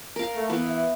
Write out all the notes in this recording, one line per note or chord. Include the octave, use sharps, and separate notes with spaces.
A#4 F5
A3
E3 B3
E5